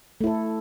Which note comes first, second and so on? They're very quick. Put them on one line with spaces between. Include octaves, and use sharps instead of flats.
A3 E4 A4